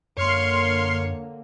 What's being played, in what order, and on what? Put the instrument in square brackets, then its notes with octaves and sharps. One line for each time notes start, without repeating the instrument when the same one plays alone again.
[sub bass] F#2 [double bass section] D3 A#3 [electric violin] C#5 [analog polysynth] C6 F6 C7